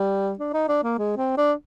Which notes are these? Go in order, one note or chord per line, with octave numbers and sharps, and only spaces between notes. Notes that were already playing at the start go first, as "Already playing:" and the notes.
Already playing: G3
D4
D#4
D4
A#3
G#3
C4
D4